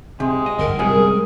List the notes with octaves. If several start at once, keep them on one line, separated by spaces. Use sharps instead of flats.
C3 G#3
D#5
G1 A#4
F#2 C3 G3 G#3 G#4